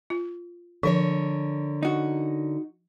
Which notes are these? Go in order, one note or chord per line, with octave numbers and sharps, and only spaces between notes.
F4
D3 F3 A#4 C#5
D#4 F#4